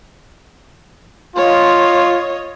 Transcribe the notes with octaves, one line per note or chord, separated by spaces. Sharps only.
F4 C#5 D#5